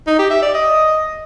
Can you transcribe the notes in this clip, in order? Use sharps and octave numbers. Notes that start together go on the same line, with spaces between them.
D#4
G4
E5
D5
D#5